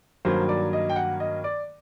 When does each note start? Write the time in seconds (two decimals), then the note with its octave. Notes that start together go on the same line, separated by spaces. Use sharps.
0.25 G2 D#3 F#3 A#3 C5
0.49 D5
0.73 D#5
0.89 G5
0.96 F#5
1.20 D#5
1.44 D5